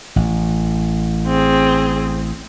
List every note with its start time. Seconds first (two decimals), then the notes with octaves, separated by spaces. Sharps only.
0.16 A1
1.27 C4 G#4